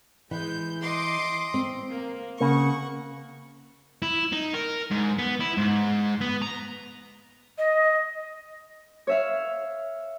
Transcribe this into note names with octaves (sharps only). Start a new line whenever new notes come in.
E3 G#3 G6
D#5 C6 D6
C4
A#3
C#3 A#3 F#5 C#6
E4
D#4
A#4
G#2
B3
E4
G#2
B3
A#5
D#5
C#5 E5 F5